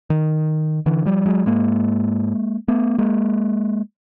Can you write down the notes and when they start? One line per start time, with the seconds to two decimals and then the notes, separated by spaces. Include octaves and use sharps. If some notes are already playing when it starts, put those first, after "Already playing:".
0.10 D#3
0.86 D3 E3
1.05 F3 G3
1.26 F#3 G#3
1.46 G#2 G#3 A#3
2.68 A3 B3
2.98 G#3 A#3